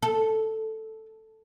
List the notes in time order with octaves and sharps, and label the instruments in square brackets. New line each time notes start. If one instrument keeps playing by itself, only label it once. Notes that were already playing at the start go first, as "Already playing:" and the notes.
[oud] A4